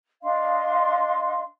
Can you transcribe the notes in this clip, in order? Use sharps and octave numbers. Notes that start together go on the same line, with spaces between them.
D4 D#5 F5 C6